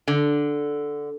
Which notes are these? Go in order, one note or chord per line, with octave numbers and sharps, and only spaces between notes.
D3